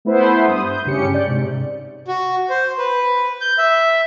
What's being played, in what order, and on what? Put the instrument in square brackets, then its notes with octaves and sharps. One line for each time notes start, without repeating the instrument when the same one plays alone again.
[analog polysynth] A3 B3 E4 B4 C5
G2 D#6
G6
G2 C#3 C#4 G4 C#7
D5 G6
G#2 C3
[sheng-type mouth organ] F#4
C5
B4
G6
E5